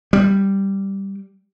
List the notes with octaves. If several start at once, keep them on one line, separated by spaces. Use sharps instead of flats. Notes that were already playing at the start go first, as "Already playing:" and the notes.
G3